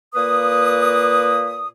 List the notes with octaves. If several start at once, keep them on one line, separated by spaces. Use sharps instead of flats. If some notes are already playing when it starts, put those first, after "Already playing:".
A#2 A#3 B4 D#6